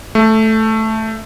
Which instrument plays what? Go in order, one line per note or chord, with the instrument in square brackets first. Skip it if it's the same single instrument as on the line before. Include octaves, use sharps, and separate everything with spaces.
[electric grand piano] A3